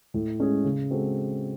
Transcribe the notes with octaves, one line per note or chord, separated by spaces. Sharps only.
A2
G#3 C#4 G#4
C#3
G#3 C4 F#4 A4